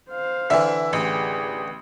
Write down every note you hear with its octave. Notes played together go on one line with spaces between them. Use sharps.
C5 F5
D3 E3 E5
A1 G4 G#4